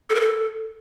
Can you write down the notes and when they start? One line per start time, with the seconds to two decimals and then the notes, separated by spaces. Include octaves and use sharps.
0.10 A4
0.15 A#4
0.20 A4